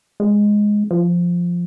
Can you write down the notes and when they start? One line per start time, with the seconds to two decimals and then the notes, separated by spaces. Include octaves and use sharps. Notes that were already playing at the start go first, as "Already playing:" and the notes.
0.20 G#3
0.91 F3